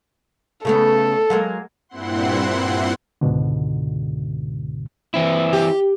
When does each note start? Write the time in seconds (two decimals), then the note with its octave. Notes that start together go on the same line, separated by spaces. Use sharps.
0.65 C#3 A3 B3 A4
1.30 F#3 G#3 A#3
1.89 G2 A#2 C4 E4 F#5 C6
3.21 C#2 G#2 B2 D3
5.14 E3 C4 E4
5.53 G4